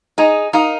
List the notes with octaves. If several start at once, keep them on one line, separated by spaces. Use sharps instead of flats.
D#4 G#4 D#5 A#5
D#4 A#4 F5 A#5 D#6